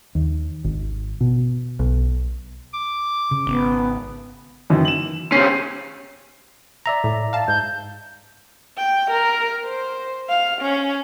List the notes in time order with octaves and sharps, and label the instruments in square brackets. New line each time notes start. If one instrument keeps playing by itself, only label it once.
[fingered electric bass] D#2
G#1
B2
B1
[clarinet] D6
[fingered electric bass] C#3
[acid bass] G#1 [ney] B3
[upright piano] F#2 D#3 E3
E7 F#7
[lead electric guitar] C3 C#4 [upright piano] C7
[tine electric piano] D5 E5 A#5
[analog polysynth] A2
F5 A5
[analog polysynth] G#2 [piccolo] G6
[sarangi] G5
A#4
C5
F5
C#4